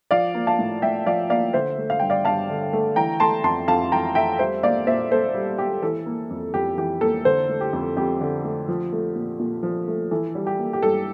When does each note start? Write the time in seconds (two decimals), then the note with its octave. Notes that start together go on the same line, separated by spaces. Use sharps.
0.11 F3 D5 F5
0.35 A#3
0.47 F5 A5
0.59 A2
0.82 A2 E5 G5
1.06 F3 D5 F5
1.30 A#3 D5 F5
1.53 D3 C5 E5
1.78 A3
1.90 F5
2.00 G2 G5
2.10 D5 F5
2.25 G2 F5 A5
2.50 D3
2.73 A3
2.96 E3 G5 A#5
3.20 A3 A5 C6
3.44 F2 A5 C6
3.68 F2 F5 A5
3.92 E3 G5 A#5
4.15 A3 E5 G5
4.39 G3 C5 E5
4.63 A#3 D5 F5
4.87 A#2 C5 E5
5.11 A#2 A4 C5
5.35 G3
5.58 A#3 G4
5.83 E3 A4
6.06 A#3
6.30 F2
6.54 F2 G4
6.77 E3 G4
7.01 A#3 A4
7.25 D3 A4 C5
7.49 A3
7.61 G4
7.73 F2
7.97 F2 G4
8.21 D3
8.44 A3
8.68 F3
8.93 A3
9.16 A#2
9.40 A#2
9.63 F3
9.88 A3
10.11 E3 A4
10.35 G3
10.47 G4
10.59 A#3
10.73 G4
10.82 G2 A4